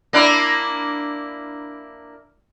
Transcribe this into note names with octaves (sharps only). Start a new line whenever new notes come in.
A#3 D4 E4